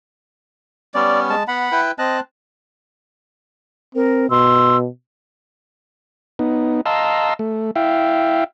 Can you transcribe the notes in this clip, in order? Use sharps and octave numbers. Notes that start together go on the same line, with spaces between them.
G3 B3 C#4 D5
G#3 A5
B3 F#5 B5
E4 B4 G5
C4 D#5 A5 F#6
C4 A#4
B2 C6 E6
B3 D#4
D#5 F5 A5 A#5 C6 E6
A3
E4 E5 F5 G5